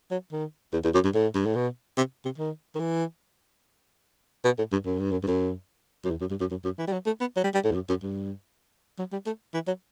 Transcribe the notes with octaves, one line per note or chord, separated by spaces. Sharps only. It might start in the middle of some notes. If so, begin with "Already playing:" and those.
F#3
D#3
E2
E2
F#2
G2
A2
G2
A2
B2
C3
C3
D#3
D#3
E3
B2
A2
G2
F#2
G2
F#2
G2
F#2
F#2
E2
F#2
G2
F#2
F#2
F#2
E3
G3
F#3
A3
B3
F#3
G3
G3
A2
E2
F#2
F#2
G2
F#3
G3
A3
E3
F#3